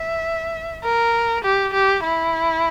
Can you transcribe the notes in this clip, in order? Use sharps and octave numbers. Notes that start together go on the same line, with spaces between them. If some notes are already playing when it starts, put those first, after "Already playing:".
Already playing: E5
A#4
G4
G4
E4